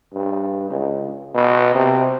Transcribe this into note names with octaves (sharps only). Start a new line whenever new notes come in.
G2
C#2
B2
C3